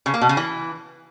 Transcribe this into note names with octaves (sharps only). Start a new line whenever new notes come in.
C#3
A#3
B2
C#3
E3